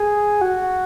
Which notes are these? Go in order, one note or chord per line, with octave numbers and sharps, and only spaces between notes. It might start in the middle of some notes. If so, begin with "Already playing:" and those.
Already playing: G#4
F#4